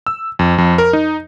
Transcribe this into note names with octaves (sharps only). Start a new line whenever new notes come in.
E6
F2
F2
A#4
D#4